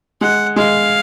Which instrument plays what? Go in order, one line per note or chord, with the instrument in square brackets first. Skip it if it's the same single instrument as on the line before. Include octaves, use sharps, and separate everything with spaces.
[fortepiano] G#3 [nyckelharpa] F#5
[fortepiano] G#3 [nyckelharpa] F5